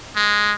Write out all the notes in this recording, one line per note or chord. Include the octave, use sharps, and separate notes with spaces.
G#3